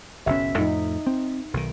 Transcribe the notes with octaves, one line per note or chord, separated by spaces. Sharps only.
F#1 B1 C#4 E5
F2 A2 D#4
C4
B1 D#3